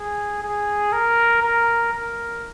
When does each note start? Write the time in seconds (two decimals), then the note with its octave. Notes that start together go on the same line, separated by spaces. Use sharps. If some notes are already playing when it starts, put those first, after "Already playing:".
Already playing: G#4
0.43 G#4
0.93 A#4
1.42 A#4
1.93 A#4